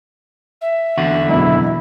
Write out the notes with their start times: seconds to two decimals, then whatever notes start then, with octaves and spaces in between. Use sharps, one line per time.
0.61 E5
0.98 E2 D3 F#4
1.29 F#1 B2 E4